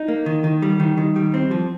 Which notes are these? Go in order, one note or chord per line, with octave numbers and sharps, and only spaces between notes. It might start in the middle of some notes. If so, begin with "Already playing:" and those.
Already playing: D#4
A#3
D#3
D#3
G3
D#3
D#3
G3
C4
F3